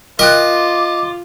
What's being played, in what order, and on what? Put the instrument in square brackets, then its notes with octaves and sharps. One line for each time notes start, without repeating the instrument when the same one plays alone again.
[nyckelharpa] F4 [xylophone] A#4 G5 F#6 [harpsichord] D#5 [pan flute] D6